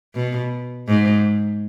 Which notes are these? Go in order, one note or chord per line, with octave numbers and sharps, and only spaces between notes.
B2
G#2